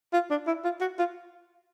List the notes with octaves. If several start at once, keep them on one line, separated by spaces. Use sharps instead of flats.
F4
D4
E4
F4
F#4
F4